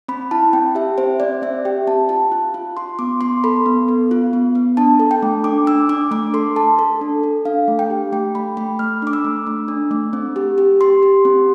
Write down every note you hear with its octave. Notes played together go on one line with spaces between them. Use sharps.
C4 B5
E4 A5
C4 G5
G4 E5
C4 C5
C4 D5
C4 E5
G4 G5
C4 A5
F4 A5
F4
F4
F4 C6
B3 D6
B3 C6
A4 B5
B3
B3
F4
B3
B3
D4 A5
A4
G5
A3
D4 D6
D4 E6
D4 D6
A3 D6
A4 C6
A4 A5
A4
D4
A4
D4 F5
A3
G5
G4
A3 G5
A3 B5
A3 B5
A3 F6
D4 D6
E6
A3
A3
D4
A3
C4
G4
G4
G4 C6
G4
C4